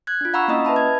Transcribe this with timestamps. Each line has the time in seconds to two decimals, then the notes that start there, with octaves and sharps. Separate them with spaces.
0.07 F#6 G#6
0.21 D4 F4
0.33 F5 F#5 A#5 B5 C#6 E6
0.48 A#3 C#4 E4 D#5 D#6
0.65 B4 E5 A5 B5
0.76 G#6